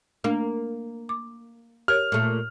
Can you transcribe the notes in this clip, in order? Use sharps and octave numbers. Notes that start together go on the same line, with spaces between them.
A3 A#3 D4 F5
D6
G4 A#4 C#5 F6
A#2 A3